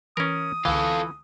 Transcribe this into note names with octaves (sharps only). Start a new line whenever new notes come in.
E3 C#4 A#4 D#6
C#2 D3 E3 F4 A4